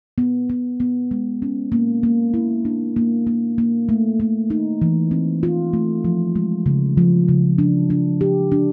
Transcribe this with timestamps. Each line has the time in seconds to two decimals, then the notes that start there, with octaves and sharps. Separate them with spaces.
0.18 B3
0.50 B3
0.80 B3
1.11 G#3
1.42 C#4
1.72 A#3
2.03 A#3
2.34 E4
2.65 D4
2.96 A#3
3.27 A#3
3.58 A#3
3.89 A3
4.20 A3
4.50 D#4
4.82 E3
5.11 C4
5.43 F4
5.73 A3
6.04 F3
6.36 G#3
6.66 C#3
6.97 F3
7.28 C#3
7.58 D4
7.90 D4
8.21 G4
8.52 D4